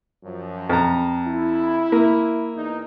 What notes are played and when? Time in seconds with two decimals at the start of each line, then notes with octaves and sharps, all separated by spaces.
0.24 F#2 F3
0.69 F2 A#5
1.27 E4
1.92 A#3
2.55 E2 D#4